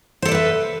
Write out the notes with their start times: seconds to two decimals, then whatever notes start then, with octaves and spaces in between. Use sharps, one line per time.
0.22 C5
0.25 A4
0.28 D5
0.32 B4
0.35 E5